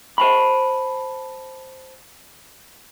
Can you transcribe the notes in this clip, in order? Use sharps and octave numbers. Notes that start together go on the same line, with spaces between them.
C5 A5 B5